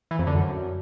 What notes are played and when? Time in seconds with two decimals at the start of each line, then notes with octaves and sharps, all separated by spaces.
0.11 E3
0.19 F2
0.27 D3
0.35 F#2